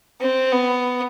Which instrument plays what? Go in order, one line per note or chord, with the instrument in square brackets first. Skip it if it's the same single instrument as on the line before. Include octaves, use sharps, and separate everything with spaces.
[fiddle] C4
B3